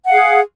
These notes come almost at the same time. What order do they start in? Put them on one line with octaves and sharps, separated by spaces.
F#5 F5 G#4